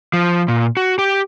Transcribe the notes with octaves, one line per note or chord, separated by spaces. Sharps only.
F3
A#2
F#4
G4